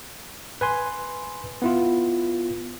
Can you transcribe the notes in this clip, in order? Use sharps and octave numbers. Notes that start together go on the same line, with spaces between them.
B4 G#5 C6
B3 E4 F4